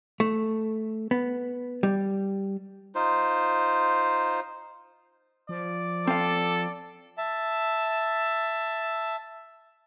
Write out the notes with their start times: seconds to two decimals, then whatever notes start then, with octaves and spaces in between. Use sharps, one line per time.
0.20 A3
1.11 B3
1.83 G3
2.95 D#4 F4 C5
5.49 F3 D5
6.07 C4 A4 F5
7.18 E5 A5